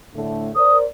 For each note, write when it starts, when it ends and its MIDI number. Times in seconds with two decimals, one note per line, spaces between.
0.15 0.50 45
0.15 0.50 50
0.15 0.50 57
0.56 0.84 70
0.56 0.84 72
0.56 0.84 74
0.56 0.77 87